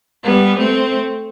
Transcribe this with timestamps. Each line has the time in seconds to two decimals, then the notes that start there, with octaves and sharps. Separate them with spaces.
0.24 G3 B3
0.59 A3 C4